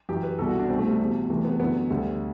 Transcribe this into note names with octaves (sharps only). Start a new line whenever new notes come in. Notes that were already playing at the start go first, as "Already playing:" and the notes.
F#2 E3 G4
B4
C2 B2 A4
F#4
D4
C2 B2 C4
A3
G3
E2 B2
C2 C3 E3 A3
B3
F#2 D3 B3
D2 D3 G3